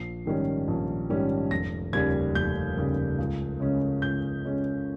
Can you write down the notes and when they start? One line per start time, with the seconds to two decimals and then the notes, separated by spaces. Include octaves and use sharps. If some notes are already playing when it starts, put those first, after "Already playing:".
Already playing: A#1 C7
0.25 G#2 D#3 G3 C#4
0.68 A#1
1.09 G#2 D#3 G3 C#4
1.51 F1 A#6
1.93 D#2 C#3 G3 G#6
2.35 F1 G6
2.77 D#2 C#3 G3
3.18 C#2
3.60 C#3 G#3 C#4
4.02 C#2 G6
4.45 C#3 G#3 C#4